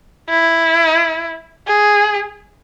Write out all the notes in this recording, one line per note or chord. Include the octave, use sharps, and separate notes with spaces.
E4
G#4